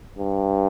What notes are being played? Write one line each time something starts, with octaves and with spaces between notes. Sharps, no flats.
G2